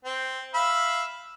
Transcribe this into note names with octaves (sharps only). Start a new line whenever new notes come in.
C4
E5 F5 B5